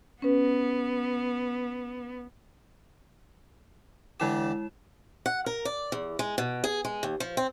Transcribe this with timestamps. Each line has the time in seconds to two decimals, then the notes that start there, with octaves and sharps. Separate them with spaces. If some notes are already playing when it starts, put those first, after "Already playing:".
0.22 B3 C#4 B4
4.20 D3 E3 G#3 E4 G4 E7
5.26 F#5
5.46 A#4
5.65 D5
5.92 E2
6.19 G#3
6.38 B2
6.64 G#4
6.85 G#3
7.03 D#2
7.20 F3
7.37 C4